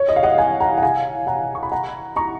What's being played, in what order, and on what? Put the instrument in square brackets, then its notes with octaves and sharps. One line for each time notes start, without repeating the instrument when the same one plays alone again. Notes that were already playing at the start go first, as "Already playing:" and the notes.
Already playing: [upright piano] C#5
D#5
F5
D#5 F#5
F5 G#5
F#5 A#5
F#5
F5 G#5
F#5 A#5
C#6
B5
F#5 A#5
A#5 C#6